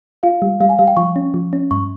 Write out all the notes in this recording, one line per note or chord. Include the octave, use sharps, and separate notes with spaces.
F4 F5
G3
G3 F5
G#5
G3 F5
G5
F3 C#6
C#4
F3
C#4
G2 C#6